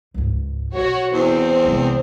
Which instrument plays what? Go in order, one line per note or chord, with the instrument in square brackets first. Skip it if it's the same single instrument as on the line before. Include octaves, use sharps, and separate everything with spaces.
[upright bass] C#2 G#2
[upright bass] B1 [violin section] F#4 C#5
[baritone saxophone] E2 [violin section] C4 C5
[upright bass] C2 G#3